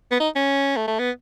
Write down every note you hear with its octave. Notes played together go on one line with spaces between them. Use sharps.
B3
D#4
C#4
A3
A3
B3